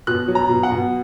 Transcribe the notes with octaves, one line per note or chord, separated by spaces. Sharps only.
B2 F#6
F#3
A#5
B2
F#5
B2